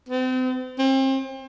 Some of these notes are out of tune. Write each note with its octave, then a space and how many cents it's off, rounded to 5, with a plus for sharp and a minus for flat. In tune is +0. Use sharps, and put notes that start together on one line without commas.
C4 -35
C4 +35